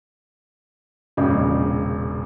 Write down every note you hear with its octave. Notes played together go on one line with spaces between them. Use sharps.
E1 A#1 C#3